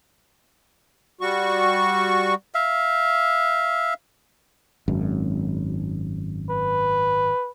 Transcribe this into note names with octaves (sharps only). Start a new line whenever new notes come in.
G3 F#4 C#6
E5 F5
G#1 F#2
B4